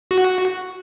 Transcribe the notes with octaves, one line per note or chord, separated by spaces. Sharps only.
F#4